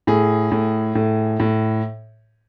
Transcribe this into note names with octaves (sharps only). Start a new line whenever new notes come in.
A2 G#4
A2
A2
A2